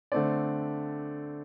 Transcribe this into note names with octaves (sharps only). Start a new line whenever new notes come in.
D3 A3 C4 D5